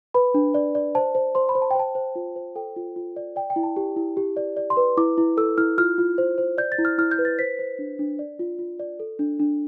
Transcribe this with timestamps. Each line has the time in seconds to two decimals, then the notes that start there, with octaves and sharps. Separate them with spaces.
0.14 B4 B5
0.34 D4
0.54 D5
0.75 D5
0.95 C5 A5
1.15 C5
1.35 C5 C6
1.49 B5
1.55 C5
1.62 A5
1.71 G5
1.75 C5 A5
1.95 C5
2.16 F4
2.36 C5
2.56 A4 G5
2.76 F4
2.96 F4
3.16 D5
3.36 D5 G5
3.50 G5
3.56 E4
3.63 A5
3.77 G4
3.96 E4
4.17 G4
4.37 D5
4.57 D5
4.70 C6
4.77 B4
4.97 E4 D6
5.18 E4
5.37 A4 E6
5.58 E4 F6
5.78 F4 F6
5.98 F4
6.18 C5
6.38 C5
6.58 D5 G6
6.72 A6
6.78 E4
6.85 F6
6.98 E4 F6
7.11 G6
7.19 B4
7.25 A6
7.39 C5 B6
7.59 C5
7.79 D4
7.99 D4
8.19 D5
8.39 F4
8.59 F4
8.79 D5
9.00 A4
9.19 D4
9.40 D4